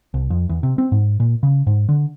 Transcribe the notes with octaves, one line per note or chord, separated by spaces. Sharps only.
C2
F2
E2
C3
C4
G#2
A#2
C#3
G#2
D3